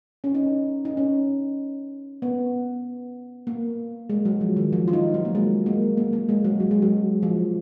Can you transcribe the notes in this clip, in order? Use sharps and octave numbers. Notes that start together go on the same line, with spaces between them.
C#4
D#4
D#4
C#4
B3
A#3
G#3
F#3
F3
D#3
F3
F4
D#4
F#3
A#3
G#3
A#3
A#3
A#3
G#3
F#3
F#3
G#3
F#3
F3